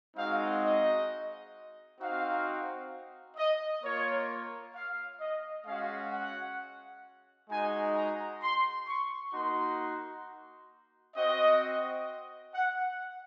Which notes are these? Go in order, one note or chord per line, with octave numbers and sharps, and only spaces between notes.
G#3 C4 D#4 F#4 F5
D#5
C4 D#4 F#4 F5
D#5
A#3 F4 C#5
F5
D#5
G#3 C#4 F#4 F5
F#5
G#3 D#4 F#4 G#5
A#5
C6
C#6
A#3 D#4 F#4 C6
C4 F#4 D#5
F#5